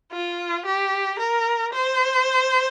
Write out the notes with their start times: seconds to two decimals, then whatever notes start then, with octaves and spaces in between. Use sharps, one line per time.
0.12 F4
0.66 G4
1.19 A#4
1.73 C5